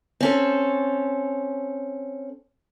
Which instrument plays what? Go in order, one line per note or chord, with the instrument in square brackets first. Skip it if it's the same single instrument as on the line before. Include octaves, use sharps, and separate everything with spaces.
[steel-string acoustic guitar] C4 C#4 A4